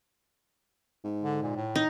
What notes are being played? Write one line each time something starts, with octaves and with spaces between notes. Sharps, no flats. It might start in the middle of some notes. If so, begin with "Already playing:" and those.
G#2
D3
A#2
A2
D#4